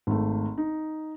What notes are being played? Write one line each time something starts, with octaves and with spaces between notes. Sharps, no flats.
G#1 A3
D#4